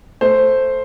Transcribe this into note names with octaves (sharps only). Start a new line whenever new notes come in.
A3 C5